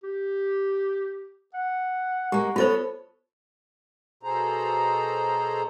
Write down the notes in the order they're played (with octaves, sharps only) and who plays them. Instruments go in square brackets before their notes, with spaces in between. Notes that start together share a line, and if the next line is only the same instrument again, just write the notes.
[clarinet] G4
F#5
[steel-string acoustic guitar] G#3 A#3 [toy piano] G4
[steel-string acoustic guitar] B3 A4 C#5 [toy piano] F4 C5
[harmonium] B2 G#4 A4 C5 A#5